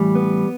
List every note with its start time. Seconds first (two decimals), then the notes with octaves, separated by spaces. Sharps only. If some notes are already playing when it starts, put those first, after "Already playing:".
Already playing: A2 E3 G3
0.15 B3